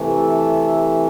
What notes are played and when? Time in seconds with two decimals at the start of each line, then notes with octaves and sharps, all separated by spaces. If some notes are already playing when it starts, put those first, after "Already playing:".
Already playing: C3 E3 A3
0.16 A4